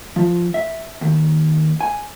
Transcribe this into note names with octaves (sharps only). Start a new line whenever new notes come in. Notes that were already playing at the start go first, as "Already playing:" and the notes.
F3
E5
D#2
G#5